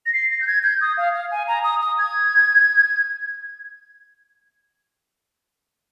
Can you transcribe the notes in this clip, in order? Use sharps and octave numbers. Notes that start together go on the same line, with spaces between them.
A#6
C7
A#6
G6
G#6
G6
D#6
F5
F5
G#5
A#5
D#6
D#6
G#6